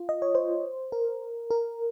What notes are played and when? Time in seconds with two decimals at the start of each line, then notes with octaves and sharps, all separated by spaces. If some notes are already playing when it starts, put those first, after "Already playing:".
Already playing: F4
0.09 D#5
0.22 C#5
0.35 C5
0.92 A#4
1.51 A#4